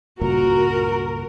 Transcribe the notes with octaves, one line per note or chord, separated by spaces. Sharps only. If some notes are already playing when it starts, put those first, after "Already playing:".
C#2 G2 A#2 F#4 A#4